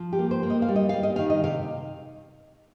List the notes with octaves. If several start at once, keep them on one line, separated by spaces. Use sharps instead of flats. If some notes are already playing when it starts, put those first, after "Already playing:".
Already playing: F3
G4
A#3
C5
A#3
D#5
F5
G3
D#5
G3 F5
D#5
D#3 F5
D#5
C3 F5